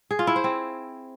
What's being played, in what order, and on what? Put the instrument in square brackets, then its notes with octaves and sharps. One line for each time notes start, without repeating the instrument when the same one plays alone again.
[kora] G#4
F4
E4
C5
C4